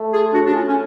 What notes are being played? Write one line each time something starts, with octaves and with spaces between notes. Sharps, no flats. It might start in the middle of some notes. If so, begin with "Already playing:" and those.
Already playing: A3
F4 G#4
A2 D4 F#4
D4
C#4 F4
C#4